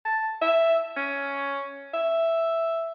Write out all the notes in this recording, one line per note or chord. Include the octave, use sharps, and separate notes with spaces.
A5
E5
C#4
E5